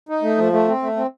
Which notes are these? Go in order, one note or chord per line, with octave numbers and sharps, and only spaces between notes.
D#4
A3
F3
A3
C4
A3
C4